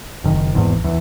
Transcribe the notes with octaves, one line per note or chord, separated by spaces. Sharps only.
F#1 D#3
G#1 E2
E2